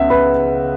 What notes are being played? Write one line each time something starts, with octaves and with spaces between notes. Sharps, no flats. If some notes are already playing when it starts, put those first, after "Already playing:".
Already playing: C#2 C#3 B3 E5 F#5
B4 B5